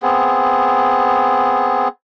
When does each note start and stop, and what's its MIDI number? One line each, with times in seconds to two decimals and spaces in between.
0.03 1.88 59
0.03 1.88 60
0.03 1.88 68